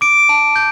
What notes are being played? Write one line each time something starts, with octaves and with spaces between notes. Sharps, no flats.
D6 D7
A5
G6